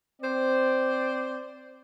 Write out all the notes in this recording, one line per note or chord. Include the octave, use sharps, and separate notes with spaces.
C4 C5 D5